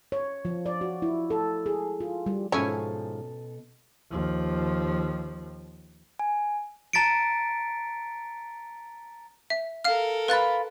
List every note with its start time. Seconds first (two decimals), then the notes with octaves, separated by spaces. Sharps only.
0.12 C#5
0.45 F3
0.66 D5
0.81 F#4
1.02 E4
1.30 A4
1.66 G#4
2.00 F4
2.26 G3
2.52 G#2 B2 F3 C#4 E4 A4 C#5 G#5
4.10 D#2 F3
6.19 G#5
6.93 A5 A#5 A6 B6 C#7 D7
9.50 E5
9.84 A4 A#4 F5 F6
10.28 F4 B4 B5 F#6 A6